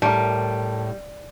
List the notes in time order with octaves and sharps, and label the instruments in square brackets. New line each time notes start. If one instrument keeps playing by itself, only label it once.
[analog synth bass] A2 [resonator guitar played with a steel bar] G3 [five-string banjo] A3 A#4